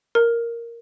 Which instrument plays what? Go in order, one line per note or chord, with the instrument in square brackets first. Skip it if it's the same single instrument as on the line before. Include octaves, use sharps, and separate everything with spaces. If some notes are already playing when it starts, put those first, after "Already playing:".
[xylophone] A#4